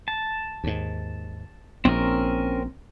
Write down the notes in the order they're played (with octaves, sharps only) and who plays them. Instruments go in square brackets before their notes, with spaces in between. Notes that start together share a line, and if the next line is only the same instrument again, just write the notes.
[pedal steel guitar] A5
[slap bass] D#2 G#2
[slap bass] A#1 [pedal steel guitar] C4 C#4 A#4